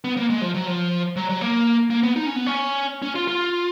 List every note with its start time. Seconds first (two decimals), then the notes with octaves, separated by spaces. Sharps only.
0.04 B3
0.17 A#3
0.30 G#3
0.41 F3
0.54 F#3
0.67 F3
1.16 F#3
1.29 F#3
1.41 A#3
1.90 A#3
2.03 B3
2.16 D#4
2.26 C#4
2.36 B3
2.46 C#4
3.02 C#4
3.15 F4
3.28 F4